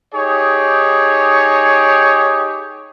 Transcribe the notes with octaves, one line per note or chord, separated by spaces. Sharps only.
D#4 G4 G#4 C#5